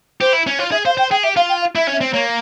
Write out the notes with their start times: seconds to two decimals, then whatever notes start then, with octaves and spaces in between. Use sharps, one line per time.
0.21 G4 C5
0.33 E4
0.47 C#4
0.59 F4 C#5
0.72 G#4 E5
0.85 C5 F5
0.97 C5 G5
1.11 G#4 G5
1.23 G4 E5
1.36 F4 F5
1.49 G5
1.62 F5
1.75 E4 E5
1.87 C#4
1.93 E5
2.01 C4
2.13 A#3 C#5